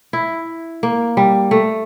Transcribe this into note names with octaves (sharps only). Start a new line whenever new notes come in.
E4
A#3
G3
A3